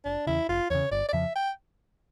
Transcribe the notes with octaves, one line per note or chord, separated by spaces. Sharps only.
F1 D4
E2 C#3 E4
F1 F4
E2 C#3 C#5
G1 D5
D5
F2 C#3 F3 E5
G5